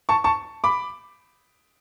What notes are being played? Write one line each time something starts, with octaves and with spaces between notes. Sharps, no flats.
A5 C#6
A5 C#6
B5 D6